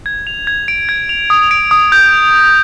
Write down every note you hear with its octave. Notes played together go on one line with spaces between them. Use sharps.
G#6
F7
G#6
D7
G#6
F7
D#6
D7
D#6
G6